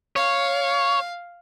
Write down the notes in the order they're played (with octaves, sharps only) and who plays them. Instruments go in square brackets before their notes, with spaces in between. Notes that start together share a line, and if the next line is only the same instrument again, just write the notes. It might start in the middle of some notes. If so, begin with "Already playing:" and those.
[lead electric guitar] C#5 [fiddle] F5